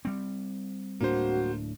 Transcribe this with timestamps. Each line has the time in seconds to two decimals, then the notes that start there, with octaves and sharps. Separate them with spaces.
0.05 G3 C4
1.01 D1 A2 A#3 D4 F#4 C5